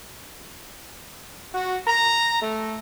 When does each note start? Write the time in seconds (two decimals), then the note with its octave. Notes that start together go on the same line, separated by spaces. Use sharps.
1.54 F#4
1.86 A#5
2.41 A3